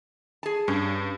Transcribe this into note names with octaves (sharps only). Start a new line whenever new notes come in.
G#4 A5
G2 C#4